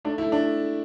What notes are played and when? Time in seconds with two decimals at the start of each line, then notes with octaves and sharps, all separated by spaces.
0.05 A3 D4
0.18 E4
0.22 A3
0.32 D4